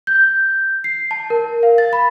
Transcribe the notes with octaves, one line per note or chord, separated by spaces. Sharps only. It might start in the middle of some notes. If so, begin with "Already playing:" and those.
G6
C7
A5
A#4
F5
A6
B5